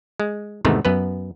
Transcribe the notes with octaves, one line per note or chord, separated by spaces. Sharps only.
G#3
E2 G#2 C3 D#3 A3 B3
F#2 B3 B4